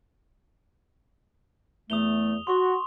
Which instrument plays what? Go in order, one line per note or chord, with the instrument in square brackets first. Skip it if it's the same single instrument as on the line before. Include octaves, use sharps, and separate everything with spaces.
[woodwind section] E2 A3 [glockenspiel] D#6 F7 G7
[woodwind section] F#4 [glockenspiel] C6 C#6